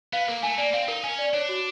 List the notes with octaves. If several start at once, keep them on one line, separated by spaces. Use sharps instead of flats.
B3 F5
A#3 A#4
A3 G#5
A#3 D5
C4 F5
D#4 A#4
C#4 G#5
D5
D4 C#5
F#4